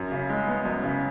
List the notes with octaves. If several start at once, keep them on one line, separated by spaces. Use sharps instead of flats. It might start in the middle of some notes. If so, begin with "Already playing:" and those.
Already playing: F#2
C#3
G#3
B3
F#2
C#3